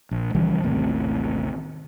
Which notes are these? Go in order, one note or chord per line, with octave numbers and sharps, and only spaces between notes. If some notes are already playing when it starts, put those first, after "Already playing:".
A#1
C#2 E3 F3 G3
A1 D#2 A2 C3